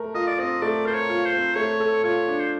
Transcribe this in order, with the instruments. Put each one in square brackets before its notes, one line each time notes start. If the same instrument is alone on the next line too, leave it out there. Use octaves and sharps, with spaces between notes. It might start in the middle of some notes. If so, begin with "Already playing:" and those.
Already playing: [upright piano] A3 A#4
[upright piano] F4 [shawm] D#5
[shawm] D5
[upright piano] C4 [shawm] D#5
[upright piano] A3 [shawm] D5
[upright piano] A#4 [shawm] C5
[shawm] C#5
[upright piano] F4
[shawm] C5
[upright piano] C4
[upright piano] A3 [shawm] C#5
[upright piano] A4
[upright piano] F4 [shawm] C#5
[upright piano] D4
[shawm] C5